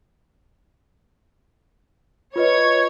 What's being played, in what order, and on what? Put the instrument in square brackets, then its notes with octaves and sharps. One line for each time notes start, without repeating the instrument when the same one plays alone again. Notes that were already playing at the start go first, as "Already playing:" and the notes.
[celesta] F4 B4 D#5 [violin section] C#5 G#6